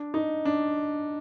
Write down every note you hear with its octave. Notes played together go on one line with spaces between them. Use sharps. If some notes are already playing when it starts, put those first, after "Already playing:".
Already playing: D4
D#4
D4